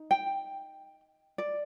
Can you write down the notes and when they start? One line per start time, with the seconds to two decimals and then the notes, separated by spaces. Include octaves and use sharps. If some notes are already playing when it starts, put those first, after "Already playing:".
Already playing: D#4
0.11 G5
1.38 D5